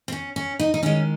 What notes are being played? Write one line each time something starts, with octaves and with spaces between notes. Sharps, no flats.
C4
C#4
C#4
D#4
D#4
D#3 G#3 C#4